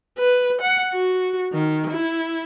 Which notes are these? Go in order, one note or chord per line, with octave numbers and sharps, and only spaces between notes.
B4
F#5
F#4
D#3
E4